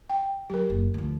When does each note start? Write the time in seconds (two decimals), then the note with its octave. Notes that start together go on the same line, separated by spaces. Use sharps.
0.10 G5
0.50 F#3 G4 A#4
0.70 F#1
0.94 D2 F3